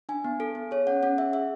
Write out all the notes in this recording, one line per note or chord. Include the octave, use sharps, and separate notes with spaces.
D4 G#5
B3
A4
B3
G#4 C#5
C#4 F#5
C#4 F#5
G#4 E5
G#4 E5